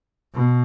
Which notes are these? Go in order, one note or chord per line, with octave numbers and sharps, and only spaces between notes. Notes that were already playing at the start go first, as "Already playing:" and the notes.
B2